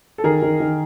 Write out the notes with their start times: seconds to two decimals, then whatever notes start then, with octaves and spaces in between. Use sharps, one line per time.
0.18 A4
0.24 D#3 G#4 A#4
0.42 D#3
0.60 D#3